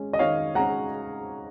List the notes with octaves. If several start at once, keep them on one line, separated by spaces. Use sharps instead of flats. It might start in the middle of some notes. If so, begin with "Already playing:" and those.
Already playing: G#3 C#4
D#5
D#3 C#5 F5
G#3 C#4 F#5 A#5